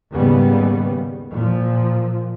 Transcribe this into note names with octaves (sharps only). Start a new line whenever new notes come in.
D#2 G#2 C#3 G3 B3
A#2 F3